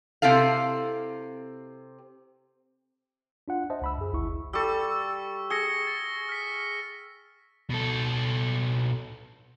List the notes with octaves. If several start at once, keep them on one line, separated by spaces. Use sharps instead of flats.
C3 C4 E4 A4 F5
D4 F4 F#5
C5 D#5 E5 A5
C#2 B5 E6
F#2 G#4
G#1 D2 E4 C#6
G3 A4 C#6 E6
G#4 A#6 C#7 G7
A6
F6 B6
B2 A4